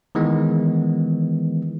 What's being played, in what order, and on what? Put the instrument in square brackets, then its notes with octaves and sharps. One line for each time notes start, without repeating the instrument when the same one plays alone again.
[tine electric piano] D#3 E3 G#3 B3